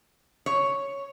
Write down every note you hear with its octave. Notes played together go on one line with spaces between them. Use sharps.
C#5